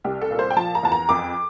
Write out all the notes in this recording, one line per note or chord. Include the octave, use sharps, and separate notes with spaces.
C2 G4
A4
A#2
C5
G5
F3 A5
A#5
E2 A5
A#5
F2 D6